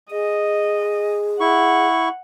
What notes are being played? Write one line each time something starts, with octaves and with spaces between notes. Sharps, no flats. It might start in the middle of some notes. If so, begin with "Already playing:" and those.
G#4 D#5
E4 F#5 C#6